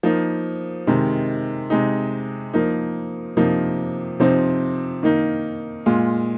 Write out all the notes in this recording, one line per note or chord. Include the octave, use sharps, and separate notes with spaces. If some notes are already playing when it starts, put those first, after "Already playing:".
F3 A#3 D#4
C3 D#3 G#3
C3 G#3 D#4
F3 A#3 D#4
C3 F3 A#3 D#4
C3 F3 C4 D#4
D#3 A#3 D#4
A#2 G#3 F4